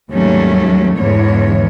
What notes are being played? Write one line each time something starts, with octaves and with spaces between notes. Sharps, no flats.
D#2 G#2 F#3 G3 A3 C#4
E2 G#2 D3 E3 C#5